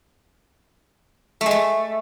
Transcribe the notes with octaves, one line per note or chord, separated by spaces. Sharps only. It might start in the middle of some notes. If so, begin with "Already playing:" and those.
A3
G#3
A3